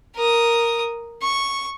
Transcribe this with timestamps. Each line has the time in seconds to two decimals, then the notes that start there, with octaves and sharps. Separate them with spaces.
0.15 A#4 D#6
1.22 C#6